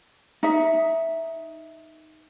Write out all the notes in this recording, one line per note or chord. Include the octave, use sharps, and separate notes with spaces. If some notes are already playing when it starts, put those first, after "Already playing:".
D#4 E5